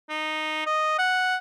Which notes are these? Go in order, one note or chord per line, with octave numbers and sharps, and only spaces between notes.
D#4
D#5
F#5